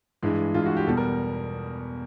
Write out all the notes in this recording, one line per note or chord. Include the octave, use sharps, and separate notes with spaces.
G2 E3 G#3
G2 E3 G#3 F4
F#4
G4
E2 B2 G3 A4
A#4